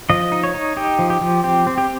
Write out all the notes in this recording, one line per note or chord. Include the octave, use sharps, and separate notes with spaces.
F3 D#5
D#4
C#5
D#4
D#4 G4
F3
G4
F3
C4 G4
C4
G4